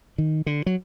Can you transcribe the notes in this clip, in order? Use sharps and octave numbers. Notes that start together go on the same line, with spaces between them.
D#3
D3
F#3